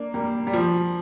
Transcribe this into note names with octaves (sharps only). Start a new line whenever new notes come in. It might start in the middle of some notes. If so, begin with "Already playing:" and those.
Already playing: A#3 D4
G3 A#3
G3
F3